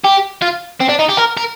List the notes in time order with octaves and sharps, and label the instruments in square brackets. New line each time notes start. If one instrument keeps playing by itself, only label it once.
[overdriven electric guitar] G4
F4
C4
D4
D#4
G4
A#4
A#4